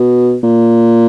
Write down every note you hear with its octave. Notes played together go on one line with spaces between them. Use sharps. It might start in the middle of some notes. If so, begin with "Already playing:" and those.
Already playing: B2
A#2